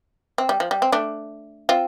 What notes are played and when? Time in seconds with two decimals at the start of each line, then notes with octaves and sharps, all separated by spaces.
0.38 C4
0.49 G3
0.60 F3
0.71 G3
0.82 C4
0.92 A3 D4
1.69 C4 F4